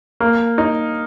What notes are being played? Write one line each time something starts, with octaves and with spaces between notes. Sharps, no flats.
A#3
D#4